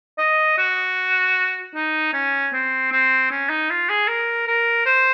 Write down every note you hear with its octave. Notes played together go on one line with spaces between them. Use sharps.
D#5
F#4
D#4
C#4
C4
C4
C#4
D#4
F4
G#4
A#4
A#4
C5